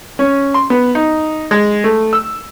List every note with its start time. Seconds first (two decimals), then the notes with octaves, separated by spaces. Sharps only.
0.19 C#4
0.54 C6
0.70 B3
0.95 D#4
1.51 G#3
1.84 A3
2.13 E6